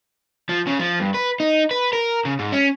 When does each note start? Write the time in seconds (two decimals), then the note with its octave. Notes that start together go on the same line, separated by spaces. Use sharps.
0.49 F3
0.67 C#3
0.80 F3
1.00 G2
1.14 B4
1.40 D#4
1.71 B4
1.93 A#4
2.25 C#3
2.39 G#2
2.53 C#4